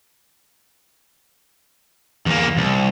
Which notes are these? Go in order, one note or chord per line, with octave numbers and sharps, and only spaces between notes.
E2 A#3
C2